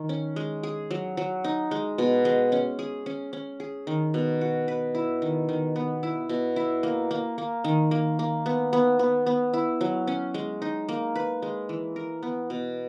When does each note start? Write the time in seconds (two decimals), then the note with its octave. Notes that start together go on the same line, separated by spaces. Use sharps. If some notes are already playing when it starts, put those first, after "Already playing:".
Already playing: D#3
0.09 C#4
0.36 G#3
0.63 G#4
0.91 F#3
1.17 F#3
1.44 D#4
1.71 G#3
1.98 B2
2.25 G#3
2.52 C#4
2.79 G#4
3.06 C#4
3.33 C#4
3.60 G#4
3.87 D#3
4.14 B2
4.41 F#4
4.68 B4
4.95 E4
5.22 D#3
5.49 D#3
5.76 B3
6.03 E4
6.29 B2
6.56 E4
6.83 A#3
7.11 A#3
7.38 A#3
7.64 D#3
7.91 A#3
8.19 A#3
8.46 B3
8.73 B3
8.99 B3
9.27 B3
9.54 E4
9.81 F#3
10.07 C#4
10.34 G#3
10.62 D#4
10.89 A#3
11.16 B4
11.42 G#3
11.69 E3
11.96 A#4
12.23 B3
12.50 B2